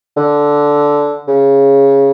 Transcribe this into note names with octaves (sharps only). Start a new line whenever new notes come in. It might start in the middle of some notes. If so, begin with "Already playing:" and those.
D3
C#3